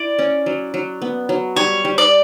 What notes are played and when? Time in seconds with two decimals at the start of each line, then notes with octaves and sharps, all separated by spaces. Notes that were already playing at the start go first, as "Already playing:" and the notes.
Already playing: E4 D5
0.19 C#4
0.46 F#3
0.74 F#3
1.02 B3
1.29 F#3
1.56 G3 C#5
1.85 G3
1.98 D5